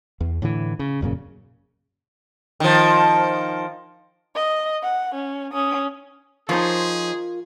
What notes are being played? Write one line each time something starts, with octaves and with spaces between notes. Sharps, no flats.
E2
A2 D3 E3
C#3
E1 F#2 A#2 C#3
D#3 F3
D#5
F#5
C#4
C#4 D#6
F3 D#4 F4 G#4 A#4 C5 C#5